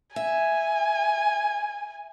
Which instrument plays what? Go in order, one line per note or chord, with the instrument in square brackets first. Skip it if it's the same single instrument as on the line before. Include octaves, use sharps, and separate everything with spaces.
[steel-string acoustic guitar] E5 [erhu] G#5